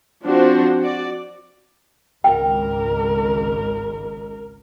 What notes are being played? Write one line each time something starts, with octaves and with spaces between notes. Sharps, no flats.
F3 C4 D4 F#4 C5
F#4 D5
G#1 C#2 A#4 G5